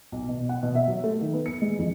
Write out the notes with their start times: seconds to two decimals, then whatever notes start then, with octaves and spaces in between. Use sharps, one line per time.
0.12 B1
0.29 B2
0.49 F#5
0.63 B2
0.75 E5
0.88 F#3
1.04 A3
1.21 D#3
1.33 B3
1.46 C#7
1.62 G#3
1.79 F2